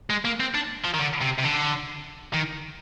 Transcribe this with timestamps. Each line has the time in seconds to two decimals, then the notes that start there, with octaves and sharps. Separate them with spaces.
0.10 G#3
0.25 A#3
0.40 C4
0.55 D4
0.84 F3
0.94 D#3
0.99 D3
1.22 C3
1.39 C3
1.45 D3
2.34 D#3